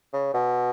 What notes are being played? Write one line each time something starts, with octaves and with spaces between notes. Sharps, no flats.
C#3
B2